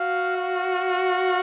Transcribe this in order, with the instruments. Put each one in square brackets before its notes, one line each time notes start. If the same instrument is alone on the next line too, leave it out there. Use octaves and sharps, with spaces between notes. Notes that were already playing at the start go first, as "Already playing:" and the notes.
Already playing: [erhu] F#4 [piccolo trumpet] F5
[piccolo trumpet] F5